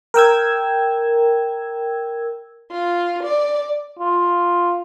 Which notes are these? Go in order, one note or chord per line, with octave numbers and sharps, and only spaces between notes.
A#4 G5 E6 G#6
F4
D5
F4